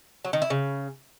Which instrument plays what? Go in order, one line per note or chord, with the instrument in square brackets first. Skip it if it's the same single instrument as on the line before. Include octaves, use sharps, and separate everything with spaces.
[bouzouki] F#3
D#3
E4
C#3